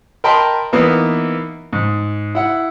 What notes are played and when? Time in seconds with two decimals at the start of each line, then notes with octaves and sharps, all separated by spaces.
0.24 A#4 D#5 G5 A5 B5 C6
0.73 E3 A#3 B3 D#4
1.73 G#2
2.35 E4 F#5